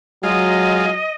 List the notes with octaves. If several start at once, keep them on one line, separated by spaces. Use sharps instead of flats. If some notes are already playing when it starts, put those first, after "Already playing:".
F#3 G#3 F4 D#5